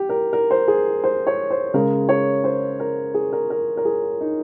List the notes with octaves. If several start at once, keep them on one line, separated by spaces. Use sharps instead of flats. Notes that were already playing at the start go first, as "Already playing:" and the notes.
Already playing: G4
A#4
A#4
C5
G#4
C5
C#5
C5
C#3 G#3 A#4
C#5
C5
A#4
G#4
A#4
A#4
A#4
G#4
D#4